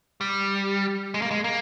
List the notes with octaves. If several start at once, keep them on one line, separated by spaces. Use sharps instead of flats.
G3
G#3
A#3
G#3
A#3